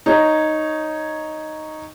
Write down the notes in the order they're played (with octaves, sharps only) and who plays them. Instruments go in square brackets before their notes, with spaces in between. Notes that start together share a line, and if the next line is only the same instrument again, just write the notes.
[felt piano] D#4 C#5